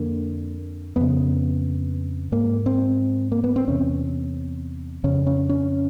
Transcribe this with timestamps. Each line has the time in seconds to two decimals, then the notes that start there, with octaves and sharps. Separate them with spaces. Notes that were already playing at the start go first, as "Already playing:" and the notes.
Already playing: F2 D3 A#3
0.96 F2 C#3 B3
2.32 G#2 A#3
2.66 C4
3.32 A#3
3.44 B3
3.56 C4
3.68 E2 C3 C#4
5.04 F2 C#3 C#4
5.27 C#4
5.49 C#4